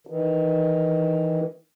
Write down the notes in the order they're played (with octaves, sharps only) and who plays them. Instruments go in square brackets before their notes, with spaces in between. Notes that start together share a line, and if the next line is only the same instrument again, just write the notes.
[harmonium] D#3 E3